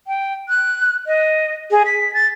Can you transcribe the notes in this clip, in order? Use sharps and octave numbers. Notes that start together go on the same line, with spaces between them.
G5
F#6
D#5
G#4
B6
A6